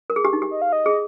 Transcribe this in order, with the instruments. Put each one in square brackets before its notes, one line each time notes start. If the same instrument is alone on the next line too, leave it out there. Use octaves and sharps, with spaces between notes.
[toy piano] A#4
G#4
G4
D#4
G4
[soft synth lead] D#5
F5
D#5
[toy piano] G#4